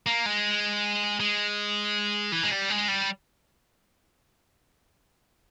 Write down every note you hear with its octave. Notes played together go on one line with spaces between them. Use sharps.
A#3
G#3
G#3
E3
G#3
G3
G#3
G3